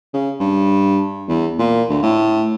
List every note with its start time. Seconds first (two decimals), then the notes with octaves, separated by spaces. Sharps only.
0.14 C#3
0.40 G2
1.28 E2
1.59 A#2
1.89 D2
2.03 A2